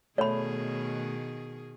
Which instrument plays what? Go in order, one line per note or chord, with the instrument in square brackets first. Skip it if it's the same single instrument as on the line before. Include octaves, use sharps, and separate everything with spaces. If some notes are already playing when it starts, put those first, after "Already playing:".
[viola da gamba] B2 D#3 G#4 [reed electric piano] A3 [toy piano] C#5 B5